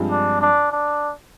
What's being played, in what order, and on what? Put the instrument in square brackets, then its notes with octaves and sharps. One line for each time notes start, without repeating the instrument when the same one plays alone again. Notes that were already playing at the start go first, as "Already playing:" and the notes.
Already playing: [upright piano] G2 F3 G#3 C4
[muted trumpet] D4
D4
D4